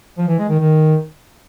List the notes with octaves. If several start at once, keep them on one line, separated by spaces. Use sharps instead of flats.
F3
E3
G#3
D#3
D#3